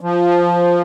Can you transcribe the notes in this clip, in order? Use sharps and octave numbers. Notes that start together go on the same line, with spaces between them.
F3